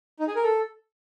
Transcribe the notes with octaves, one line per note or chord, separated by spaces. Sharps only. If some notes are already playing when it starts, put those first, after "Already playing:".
D#4
G#4
A#4
A4